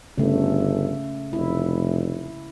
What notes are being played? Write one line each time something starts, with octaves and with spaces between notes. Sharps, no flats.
G1 C#3 A3
F1 E4